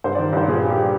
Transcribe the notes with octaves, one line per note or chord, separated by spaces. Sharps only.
G2 C5
D5
D#3
G2 C5
A#2 G#4
G3
G4
G3